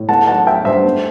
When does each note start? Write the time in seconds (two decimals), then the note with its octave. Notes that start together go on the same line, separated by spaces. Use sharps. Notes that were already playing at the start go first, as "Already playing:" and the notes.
Already playing: A2
0.09 A3 F#5 A5
0.27 F#3 F#5 A5
0.47 F#3 E5 G5
0.65 G2 C5 E5
0.84 A3